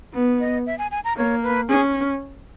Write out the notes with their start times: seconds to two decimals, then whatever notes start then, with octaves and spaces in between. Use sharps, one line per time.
0.14 B3
0.40 D#5
0.66 E5
0.78 G#5
0.91 G#5
1.04 A#5
1.17 A#3 C#5
1.43 B4
1.69 C#4 G#4